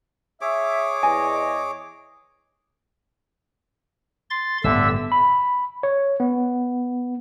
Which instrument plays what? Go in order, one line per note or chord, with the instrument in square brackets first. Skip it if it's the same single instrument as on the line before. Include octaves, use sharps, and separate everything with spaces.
[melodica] G#4 C#5 D6 [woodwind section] E5
[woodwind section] E2 D#5 [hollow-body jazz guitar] G#5
[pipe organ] C6 A6
[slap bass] G1 A2 B3 [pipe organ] D3 E5 E6
[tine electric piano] B5
C#5
B3